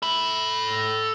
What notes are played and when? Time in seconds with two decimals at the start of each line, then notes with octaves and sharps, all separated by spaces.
0.02 A4 B5